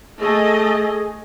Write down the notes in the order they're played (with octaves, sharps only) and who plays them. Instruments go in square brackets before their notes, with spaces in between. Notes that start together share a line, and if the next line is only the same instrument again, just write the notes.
[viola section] A3 A4 D#5 [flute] G#4